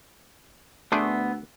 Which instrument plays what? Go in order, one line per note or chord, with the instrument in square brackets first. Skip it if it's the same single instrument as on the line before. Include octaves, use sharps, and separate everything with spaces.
[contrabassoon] D2 [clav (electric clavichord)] A3 D4 G#4 [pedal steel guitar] B3 C6 E6